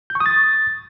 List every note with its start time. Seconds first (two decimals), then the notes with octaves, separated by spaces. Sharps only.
0.10 G6
0.15 C#6
0.20 D#6
0.26 A6